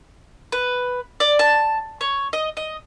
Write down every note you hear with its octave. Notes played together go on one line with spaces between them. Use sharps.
B4
D5
A5
C#5
D#5
D#5